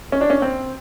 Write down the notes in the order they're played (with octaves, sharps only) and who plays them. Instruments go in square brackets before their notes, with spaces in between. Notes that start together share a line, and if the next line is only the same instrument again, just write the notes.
[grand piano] C#4
D4
C#4
C4